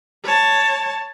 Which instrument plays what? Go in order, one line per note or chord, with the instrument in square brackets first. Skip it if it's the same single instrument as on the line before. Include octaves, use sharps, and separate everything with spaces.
[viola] C#5 A5